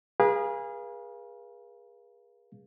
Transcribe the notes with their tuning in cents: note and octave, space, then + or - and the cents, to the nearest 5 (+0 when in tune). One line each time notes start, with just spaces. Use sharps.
G#4 -20 B4 -45 F5 -10